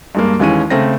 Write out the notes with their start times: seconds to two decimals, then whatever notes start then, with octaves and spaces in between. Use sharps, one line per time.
0.15 G2 G#3 A#3
0.40 D#2 E3 G#3 C#4 G#5 D#7
0.70 C#3 A3 C4 A#6